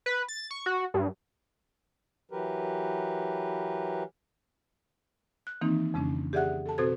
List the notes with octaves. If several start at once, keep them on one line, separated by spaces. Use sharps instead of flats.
B4
A6
C#6
F#4
G2
E3 F#3 G4 A#4 B4
F#6
D#3 E3 A#3 C4 D#4
F2 C#3 G#3 C#4 D4
G4 G#4 D5 E5 F#5 F#6
A4 A5
B2 C4 F#4 A4 C5 G#6